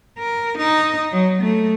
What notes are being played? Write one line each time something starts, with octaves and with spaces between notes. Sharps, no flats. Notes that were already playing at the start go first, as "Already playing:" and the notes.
A#4
D#4
F#3
A3